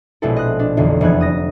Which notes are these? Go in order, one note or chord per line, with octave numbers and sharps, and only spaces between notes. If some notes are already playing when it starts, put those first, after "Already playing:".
A#1 B2 G#3 C4 E4 A4
D#5 F#6
D4
B1 F2 D3 E3
F1 E2 B3 F#6 G#6
D#6 A#6